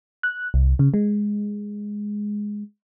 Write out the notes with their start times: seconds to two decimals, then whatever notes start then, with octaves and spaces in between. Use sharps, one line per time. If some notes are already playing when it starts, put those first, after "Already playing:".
0.23 F#6
0.54 C2
0.79 C#3
0.94 G#3